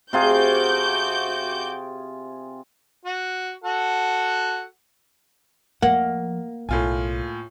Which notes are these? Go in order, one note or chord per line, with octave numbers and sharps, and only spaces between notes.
C3 F4 F#4 G#4 D6 G6
F#4
F#4 A4 F#5
F2 F3 A#3 F#5
B1 A2 F4 G#5